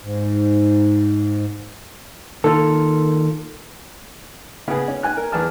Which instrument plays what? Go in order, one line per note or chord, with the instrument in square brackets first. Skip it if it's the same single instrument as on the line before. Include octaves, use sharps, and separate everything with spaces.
[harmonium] G#2
[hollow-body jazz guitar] D#3 A#3 F4 [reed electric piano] A4
[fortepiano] C#3 B3 G#4
C#4
G#5 F#6
A#4
E2 G#4 B4 A5 F6